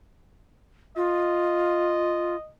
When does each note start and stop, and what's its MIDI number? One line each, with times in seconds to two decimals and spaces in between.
0.96 2.36 65
0.96 2.52 75